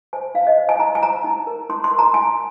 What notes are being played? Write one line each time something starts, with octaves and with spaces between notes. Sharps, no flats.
C5 G#5
D#4 F5
D#5
C5
G#5
D#4 A#5
G#5
C5 A#5
D#4
A#4
D#4 C6
C6
A#4
A#5
D#4 G#5